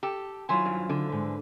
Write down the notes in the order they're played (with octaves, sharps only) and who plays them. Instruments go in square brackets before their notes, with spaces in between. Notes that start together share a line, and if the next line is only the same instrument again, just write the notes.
[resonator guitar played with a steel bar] G4 [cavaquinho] A4
[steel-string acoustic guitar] D#3 F#3 F4 [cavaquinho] E4 C5 G#5
[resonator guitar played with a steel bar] G2
D3
[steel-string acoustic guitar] G#2 B4